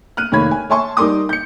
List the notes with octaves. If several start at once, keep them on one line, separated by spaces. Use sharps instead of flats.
F6 F#6 D#7
F1 D#3 A#3 C#5 B5 G#6
G#5
C#5 E5 G#5 A5 C6 C#6
G3 D#4 A#4 C6 D6 D#6
G6 C#7